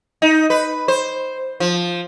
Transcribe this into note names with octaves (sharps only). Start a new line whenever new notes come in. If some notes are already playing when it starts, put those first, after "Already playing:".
D#4
B4
C5
F3